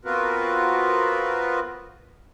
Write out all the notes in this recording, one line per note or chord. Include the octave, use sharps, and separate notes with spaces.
B3 C4 F4 F#4 A#4 B4